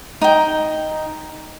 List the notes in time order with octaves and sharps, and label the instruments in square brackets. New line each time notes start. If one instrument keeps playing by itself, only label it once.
[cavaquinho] D#4 G5